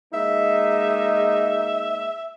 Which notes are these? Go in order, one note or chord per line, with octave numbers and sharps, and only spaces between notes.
G#3 A#3 D#4 E5